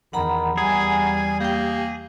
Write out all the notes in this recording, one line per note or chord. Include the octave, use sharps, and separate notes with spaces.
E2 D#3 F#5 A#5 B5
E2 G3 G#4 G#5
A#3 G4 G5